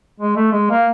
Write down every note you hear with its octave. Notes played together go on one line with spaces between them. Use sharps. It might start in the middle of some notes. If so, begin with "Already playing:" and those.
G#3
A3
G#3
A#3